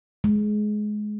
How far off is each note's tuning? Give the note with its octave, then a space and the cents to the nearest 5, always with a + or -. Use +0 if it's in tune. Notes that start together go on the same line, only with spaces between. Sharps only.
G#3 +20